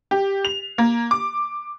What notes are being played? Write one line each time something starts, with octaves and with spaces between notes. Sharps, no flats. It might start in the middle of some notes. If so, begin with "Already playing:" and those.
G4
F7
A#3
D6